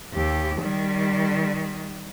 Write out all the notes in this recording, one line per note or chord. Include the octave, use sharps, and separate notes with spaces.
D#2 G4
D#3 G3